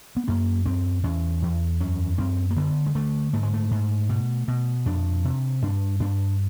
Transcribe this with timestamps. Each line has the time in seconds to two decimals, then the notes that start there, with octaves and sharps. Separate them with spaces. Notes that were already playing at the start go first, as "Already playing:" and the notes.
0.16 B3
0.28 F#2 A#3
0.66 F#2 C4
1.03 E2 C#4
1.42 E2
1.80 F#2 C#4
2.18 F#2 C4
2.50 A#3
2.56 D3 B3
2.86 G#3
2.95 D3 A3
3.33 G#2 A3
3.43 G#3
3.53 A3
3.71 G#2
4.09 B2
4.48 B2
4.86 F2 D4
5.24 C3
5.62 G2 D4
6.00 G2 D4